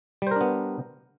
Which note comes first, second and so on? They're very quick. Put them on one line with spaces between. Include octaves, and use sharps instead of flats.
G3 C5 A#4 D4 B3